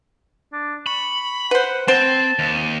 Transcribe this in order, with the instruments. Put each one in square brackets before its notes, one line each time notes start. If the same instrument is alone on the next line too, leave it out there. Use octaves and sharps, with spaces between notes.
[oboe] D4
[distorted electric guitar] B5 [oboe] C#6
[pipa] B4 C5 [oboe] F#5
[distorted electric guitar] C4 [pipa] C5 [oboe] A5
[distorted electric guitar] D#2